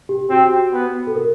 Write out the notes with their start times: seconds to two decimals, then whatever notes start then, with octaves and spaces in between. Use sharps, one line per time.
0.09 G4
0.30 C4 F#4
0.73 B3
1.07 A4
1.16 A#4